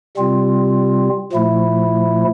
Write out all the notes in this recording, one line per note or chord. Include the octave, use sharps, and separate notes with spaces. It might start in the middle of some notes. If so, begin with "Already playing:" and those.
C3 G3 C4 F4
A#2 F3 A3 E4